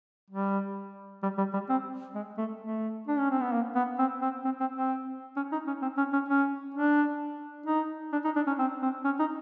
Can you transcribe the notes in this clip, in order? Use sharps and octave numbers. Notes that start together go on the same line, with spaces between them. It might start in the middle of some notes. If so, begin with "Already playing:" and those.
G3
G3
G3
G3
C4
G#3
A3
A3
D4
C#4
C4
B3
A#3
B3
C4
C4
C4
C4
C4
C#4
D#4
C#4
C4
C#4
C#4
C#4
D4
D#4
D4
D#4
D4
C#4
C4
C4
C#4
D#4